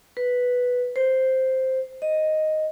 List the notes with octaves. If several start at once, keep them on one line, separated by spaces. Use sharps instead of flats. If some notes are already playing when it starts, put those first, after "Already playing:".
B4
C5
D#5